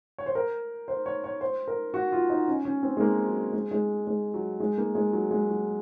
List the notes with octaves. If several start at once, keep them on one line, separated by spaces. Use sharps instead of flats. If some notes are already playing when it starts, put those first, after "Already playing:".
C#5
C5
A#4
C5
C#5
C#5
C5
A#4
F#4
F4
D#4
C#4
C#4
C4
G#3
A#3
F#3
G#3
G#3
G#3
F#3
G#3
A#3
G#3
F#3
G#3
F#3